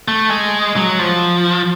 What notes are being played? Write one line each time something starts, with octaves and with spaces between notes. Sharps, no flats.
A3
G#3
F#3
F3